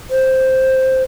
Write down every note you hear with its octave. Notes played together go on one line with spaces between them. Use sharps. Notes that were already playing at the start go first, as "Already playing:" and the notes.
C5